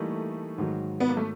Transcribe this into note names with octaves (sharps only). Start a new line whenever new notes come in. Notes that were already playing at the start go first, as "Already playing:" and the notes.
Already playing: E3 G3 A3 A#3 D#4
G#2 D#3 F#3
B3
A#3
A3